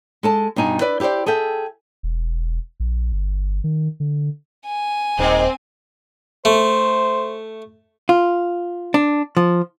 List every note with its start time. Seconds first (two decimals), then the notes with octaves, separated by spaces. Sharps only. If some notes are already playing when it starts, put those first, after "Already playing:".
0.23 G#3 A4 A5
0.56 G2 B2 D#4 G#5
0.81 E4 B4 D5
1.00 E4 G4 A4 C5 D5
1.26 G#4 A4 E5 G5
2.03 E1
2.80 A#1
3.12 G1
3.64 D#3
4.00 D3
4.66 G#5
5.19 D#1 G#3 A#3 C4 D#4
6.45 A3 C5
8.09 F4
8.94 D4
9.37 F3